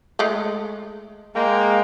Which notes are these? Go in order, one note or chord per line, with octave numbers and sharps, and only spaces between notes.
G#3 A3
G#3 A#3 F5 G5 A#5